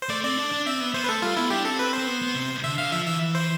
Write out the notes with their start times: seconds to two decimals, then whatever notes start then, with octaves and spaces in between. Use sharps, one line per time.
0.02 C5
0.09 A3 D5
0.24 C4 D5
0.37 D4
0.52 D4
0.66 C4 E5
0.80 B3
0.94 B3 C5
1.04 B4
1.09 A3 A4
1.22 G3 F4
1.37 B3 E4
1.50 D4 G4
1.64 C4 A4
1.79 B4
1.93 C4 C5
2.07 B3
2.22 B3
2.35 C3
2.63 D3 E5
2.78 D3 F5
2.92 F3 E5
3.06 E3 E5
3.35 C5